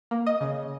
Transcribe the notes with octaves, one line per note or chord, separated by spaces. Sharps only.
A#3
D#5
C#3